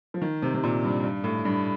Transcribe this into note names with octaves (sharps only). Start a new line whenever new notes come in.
F3
D#3
C3
C3
A#2
G2
G2
A2
G2